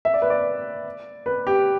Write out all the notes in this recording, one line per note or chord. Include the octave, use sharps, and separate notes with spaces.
E5
D5
B4
D5
B4
G4